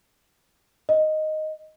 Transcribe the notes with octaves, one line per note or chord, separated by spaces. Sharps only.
D#5